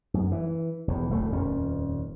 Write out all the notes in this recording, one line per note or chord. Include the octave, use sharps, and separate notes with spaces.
F#2
E3
E1 E2
D1 E2 A3
D#1 F2 C#4